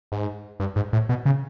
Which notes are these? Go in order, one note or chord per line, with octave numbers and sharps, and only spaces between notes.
G#2
G2
G#2
A2
B2
C#3